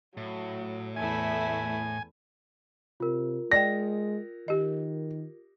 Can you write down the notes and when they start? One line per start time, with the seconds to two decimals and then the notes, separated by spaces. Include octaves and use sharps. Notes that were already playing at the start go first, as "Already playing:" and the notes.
0.17 A2 F#3
0.96 E2 A3 E4 E5 G#5
3.00 C3 F4 A#4
3.52 G#3 D5 D#5 G5 A#6
4.48 D#3 G4 D#5